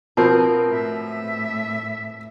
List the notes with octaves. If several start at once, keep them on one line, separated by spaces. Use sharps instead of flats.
B2 F3 C4 A#4 B4
A2 E5